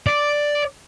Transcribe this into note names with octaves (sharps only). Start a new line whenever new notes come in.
D5